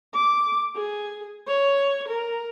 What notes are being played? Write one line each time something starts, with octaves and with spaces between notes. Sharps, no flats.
D6
G#4
C#5
A#4